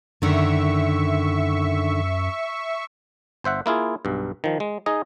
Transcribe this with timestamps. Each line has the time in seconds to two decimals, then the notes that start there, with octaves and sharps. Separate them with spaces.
0.22 F#2 D3 D#3 E5 C#6
3.44 G1 C5 E5 F#5
3.66 A#3 E4 F4 G#4
4.05 B1 G2
4.44 D#3 F3
4.60 G#3
4.86 D#4 G#4 D#5